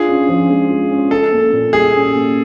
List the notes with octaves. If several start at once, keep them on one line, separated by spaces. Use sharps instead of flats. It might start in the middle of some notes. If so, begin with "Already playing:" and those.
Already playing: D4 F4 G#4
C#4
F3
G#3
F4
C#4
C#4 A4
A#3
A#2
G3 G#4
C#4
A#3